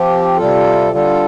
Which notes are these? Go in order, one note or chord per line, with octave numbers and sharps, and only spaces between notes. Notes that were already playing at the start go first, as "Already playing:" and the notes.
Already playing: F3 C4 G4
C3 G3 F4 A4
D3 G3 F4 A4